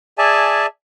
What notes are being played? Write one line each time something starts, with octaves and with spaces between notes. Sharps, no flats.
G#4 D5 E5 G#5 A5